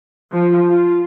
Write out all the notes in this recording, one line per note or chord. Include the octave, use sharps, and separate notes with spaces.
F3
F4